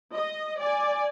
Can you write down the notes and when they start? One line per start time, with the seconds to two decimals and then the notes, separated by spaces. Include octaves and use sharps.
0.14 D#5
0.59 D5 G#5